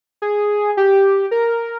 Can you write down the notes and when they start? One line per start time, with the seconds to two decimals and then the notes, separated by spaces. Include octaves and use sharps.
0.22 G#4
0.77 G4
1.31 A#4